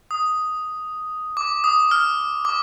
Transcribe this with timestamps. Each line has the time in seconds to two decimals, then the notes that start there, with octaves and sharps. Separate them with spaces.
0.11 D#6
1.37 D6
1.64 D#6
1.91 F6
2.45 D6